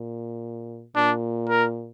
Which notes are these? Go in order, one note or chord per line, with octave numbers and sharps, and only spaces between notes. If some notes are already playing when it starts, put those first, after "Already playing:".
Already playing: A#2
A#2 D4
A#4